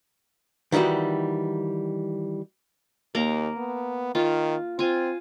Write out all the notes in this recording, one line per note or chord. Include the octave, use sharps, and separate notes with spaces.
D#3 E3 G3 D#4 F#4
D#2 A#3 A#5
B3
D#3 F4
C4 F4 G#5